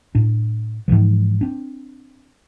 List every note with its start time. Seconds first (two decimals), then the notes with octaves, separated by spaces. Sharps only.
0.15 A2 D4
0.88 G#2 C#3 E3 F3
1.41 C4 D4